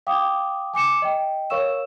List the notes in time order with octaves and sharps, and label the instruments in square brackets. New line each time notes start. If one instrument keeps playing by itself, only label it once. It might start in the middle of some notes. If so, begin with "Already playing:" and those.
[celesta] F5 G5 D6 D#6
G#5 D6 C#7 E7
D#5 G5
A#4 C#5 F5 C#6 E6 E7